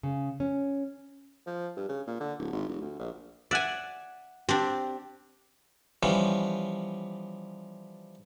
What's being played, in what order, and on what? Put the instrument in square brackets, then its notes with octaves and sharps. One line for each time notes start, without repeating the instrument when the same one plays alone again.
[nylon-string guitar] C#3
C#4
[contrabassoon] F3
G2
C#3
A#2
D3
D1
G#1
F1
D2
A#1
[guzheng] D5 G#5 [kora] E5 F#5
[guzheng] C4 D4 [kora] G4
[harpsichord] E3 F3 G3 B3 C#4